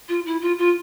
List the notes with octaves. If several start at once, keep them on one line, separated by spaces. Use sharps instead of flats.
F4
E4
F4
F4